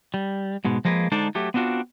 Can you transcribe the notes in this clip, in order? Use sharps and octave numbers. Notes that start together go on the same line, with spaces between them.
G3
G#2 B2 G#3
F3 G#3 A#3 G#4 B4
D3 G#3 D4 D#4 A4 C5
F#3 A3 G4
B3 C4 D4 F4 F#4